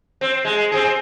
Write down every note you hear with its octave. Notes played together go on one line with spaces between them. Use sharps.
C4
G#3
C4 G#4